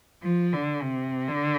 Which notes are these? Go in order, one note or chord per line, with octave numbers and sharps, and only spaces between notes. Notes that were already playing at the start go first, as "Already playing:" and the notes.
F3
D3
C3
D3